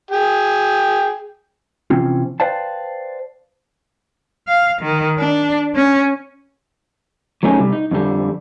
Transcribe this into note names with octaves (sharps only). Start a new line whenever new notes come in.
G#4 G5
C3 E3 F3 C4 C#4 F4
B4 C5 D5 F5 G5 A5
F5
D#3
D4
C#4
F#3 A3 C#4 D#4 F4 G#4
C3 G3
D#4
F2 D3 G3